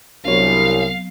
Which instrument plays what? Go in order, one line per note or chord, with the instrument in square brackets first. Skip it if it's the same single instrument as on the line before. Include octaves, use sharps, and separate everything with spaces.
[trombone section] C2 [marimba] F#3 B3 C4 [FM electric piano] D4 F#4 C#5 [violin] F5